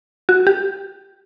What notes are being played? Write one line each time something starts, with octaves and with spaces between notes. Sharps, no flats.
F#4
G4